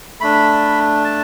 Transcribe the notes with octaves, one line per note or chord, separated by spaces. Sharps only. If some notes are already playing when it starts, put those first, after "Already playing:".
A3 D4 B5
A5